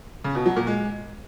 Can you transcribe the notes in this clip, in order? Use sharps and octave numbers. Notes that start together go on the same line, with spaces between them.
C#3
B2
F#3
A#2
G#3